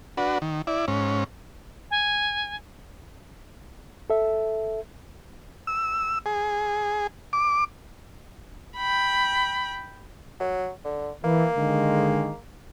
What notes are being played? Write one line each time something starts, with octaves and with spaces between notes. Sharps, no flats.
D4 F#4 B4
D#3
E4 D5
G#2 C#4
G#5
A4 E5
E6
G#4
D6
G5 B5
F#3
D3
E3 A#3
D3 D#3 G#3